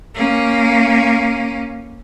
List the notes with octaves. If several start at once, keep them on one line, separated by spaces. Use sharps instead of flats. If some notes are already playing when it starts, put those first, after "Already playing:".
A#3 C#4